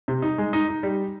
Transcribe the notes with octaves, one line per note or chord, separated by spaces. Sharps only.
C3
D#4
G#3
D#4
D#4
G3